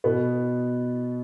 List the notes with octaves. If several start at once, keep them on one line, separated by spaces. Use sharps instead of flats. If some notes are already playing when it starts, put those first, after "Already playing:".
B2 B3